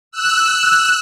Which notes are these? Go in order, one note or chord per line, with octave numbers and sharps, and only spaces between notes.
E6 F#6